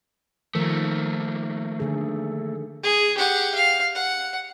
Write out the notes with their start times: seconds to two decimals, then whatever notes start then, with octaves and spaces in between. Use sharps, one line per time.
0.55 D#3 F3 A3 A#3 A#4
1.80 D3 G#4
2.83 G#4
3.17 G4 F#5
3.55 F5
3.95 F#5